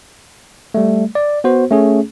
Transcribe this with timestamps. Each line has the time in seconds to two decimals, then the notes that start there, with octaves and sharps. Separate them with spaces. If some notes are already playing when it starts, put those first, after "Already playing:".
0.74 G3 A3
1.15 D5
1.44 B3 F#4 C5
1.71 A3 C#4 G#4